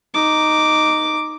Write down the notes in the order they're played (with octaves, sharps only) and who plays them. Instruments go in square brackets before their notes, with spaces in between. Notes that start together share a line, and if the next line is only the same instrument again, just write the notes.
[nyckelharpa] D#4 D6